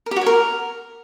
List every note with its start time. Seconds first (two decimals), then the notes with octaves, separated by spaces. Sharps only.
0.06 A#4
0.11 G4
0.16 F#4
0.21 C#5
0.26 A#4